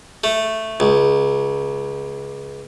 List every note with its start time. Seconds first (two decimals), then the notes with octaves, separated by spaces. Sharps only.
0.24 A3
0.80 C#2